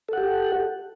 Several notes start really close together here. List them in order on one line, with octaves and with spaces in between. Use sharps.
A4 F#5 G4